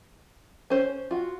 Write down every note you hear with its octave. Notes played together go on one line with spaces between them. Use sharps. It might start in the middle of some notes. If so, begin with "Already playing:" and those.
C#4 C5
F4 F#4